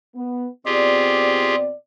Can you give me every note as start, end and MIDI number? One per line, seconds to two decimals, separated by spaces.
0.15 0.47 59
0.66 1.72 47
0.66 1.72 60
0.66 1.55 65
0.66 1.55 67
0.66 1.55 68
0.66 1.72 74